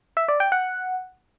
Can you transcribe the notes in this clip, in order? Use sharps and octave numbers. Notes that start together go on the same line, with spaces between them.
E5
D5
G5
F#5